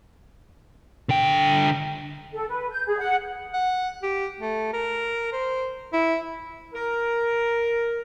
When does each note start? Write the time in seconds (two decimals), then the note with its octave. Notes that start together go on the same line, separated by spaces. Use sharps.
1.09 D3 G5
2.33 A4
2.49 B4
2.70 G6
2.87 G#4
2.99 F#5
3.54 F#5
4.03 G4
4.41 A3
4.73 A#4
5.33 C5
5.93 E4
6.74 A#4